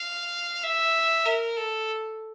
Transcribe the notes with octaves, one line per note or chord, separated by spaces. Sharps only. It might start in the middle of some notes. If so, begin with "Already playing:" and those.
Already playing: F5
E5
A#4
A4